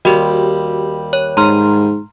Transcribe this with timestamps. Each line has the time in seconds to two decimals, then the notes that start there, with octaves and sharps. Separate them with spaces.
0.05 D#2 G3 F#4 G4
1.13 C#5
1.37 G#2 A#5 C6 F6